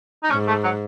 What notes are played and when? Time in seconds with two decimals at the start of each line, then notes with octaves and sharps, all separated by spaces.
0.23 D#4
0.31 G#2 C#4
0.47 A3
0.64 F#3